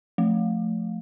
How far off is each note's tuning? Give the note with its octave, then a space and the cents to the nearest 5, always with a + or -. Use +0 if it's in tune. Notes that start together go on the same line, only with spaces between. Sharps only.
F3 +15 A3 +0